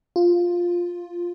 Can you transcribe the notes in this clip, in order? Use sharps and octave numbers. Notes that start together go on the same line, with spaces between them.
F4